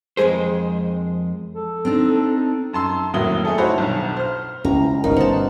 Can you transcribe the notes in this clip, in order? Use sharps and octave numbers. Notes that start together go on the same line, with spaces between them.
F2 C#3 G#3 G#4 C5
A4
C4 D4 D#4
F#2 A5 C6 E6
F1 A2 F#3 A#3 D#6 G7
A3 G#4 A4
D#4 E4 F#4 C5 C#5 B5
B1 G2
C5 F6
C#2 C#4 E4 A#5
G1 B2 D#4 A#4 F5
C5 F#5 A5